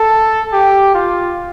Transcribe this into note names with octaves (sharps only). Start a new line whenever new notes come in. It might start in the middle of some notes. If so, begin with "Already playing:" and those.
Already playing: A4
G4
F4